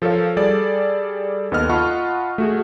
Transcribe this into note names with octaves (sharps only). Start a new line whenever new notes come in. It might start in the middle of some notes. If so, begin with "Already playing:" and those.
F3 A4 A#4 C#5 F5
G3 G#4 A4 D5
D#2 B3 A4 D#5 F6
F4 D#5 F#5 A5 B5 C#6
A3 F#4 G#4